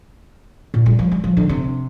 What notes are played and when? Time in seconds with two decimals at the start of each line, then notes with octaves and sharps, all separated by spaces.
0.74 A#2
0.86 G3
0.99 F3
1.12 G3
1.24 F3
1.37 D3
1.49 C3